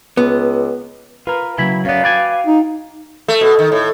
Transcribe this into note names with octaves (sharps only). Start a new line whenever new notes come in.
C#2 B3
F4 A#4 B4
C#3 F#3 A#3 E4 G#5 B5 G#6
F#2 B3 C#4 D5 F5
F#4 B4 D5 G5 G#5
D#4
A3
B2
D#3
A2